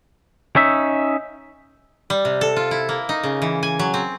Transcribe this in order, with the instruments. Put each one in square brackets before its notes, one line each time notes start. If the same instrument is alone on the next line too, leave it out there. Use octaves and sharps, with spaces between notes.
[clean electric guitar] C#4 D#4 E5
[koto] G3
C3
A4
F4
E4
A#3
D#4
C#3
E3
G#5
F#3
C4